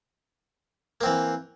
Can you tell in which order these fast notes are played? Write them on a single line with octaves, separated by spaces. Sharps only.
A#3 C4 E3